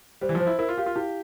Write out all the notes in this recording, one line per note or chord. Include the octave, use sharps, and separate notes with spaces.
G3 C5
E3
F3
C5
E4
E4 A#4
F4
G4 F5
F4
E4 G4